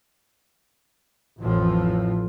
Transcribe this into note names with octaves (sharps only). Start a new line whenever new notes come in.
A1 F2 A2 F3